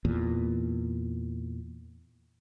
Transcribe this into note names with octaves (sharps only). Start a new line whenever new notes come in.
E2 A#2